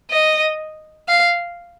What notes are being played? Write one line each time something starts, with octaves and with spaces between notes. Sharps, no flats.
D#5
F5